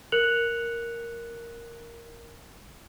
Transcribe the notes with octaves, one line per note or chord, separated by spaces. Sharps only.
A#4 F#6 C#7 F7 F#7